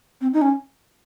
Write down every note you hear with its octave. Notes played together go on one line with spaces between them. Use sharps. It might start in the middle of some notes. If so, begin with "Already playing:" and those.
C4
D#4
C#4